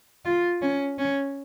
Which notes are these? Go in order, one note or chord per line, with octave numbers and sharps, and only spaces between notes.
F4
C#4
C#4